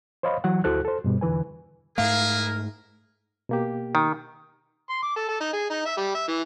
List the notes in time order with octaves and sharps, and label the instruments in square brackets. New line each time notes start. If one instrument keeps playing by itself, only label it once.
[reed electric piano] C5 C#5 D#5 F5 B5
E3 F#3 F#5
D2 E4 F#4 A4 C5 F#6
A4 C5
G2 B2 G3
E2 D3 E3 B4 G#5
[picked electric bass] G#2 A3 [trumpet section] E4 G#4 [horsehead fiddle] A#4 [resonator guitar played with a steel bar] F5
[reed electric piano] B2 A#3 G4
[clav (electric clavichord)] D#3
[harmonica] C6
D6
A4
A4
D#4
G#4
D#4
E5
G3
E5
E3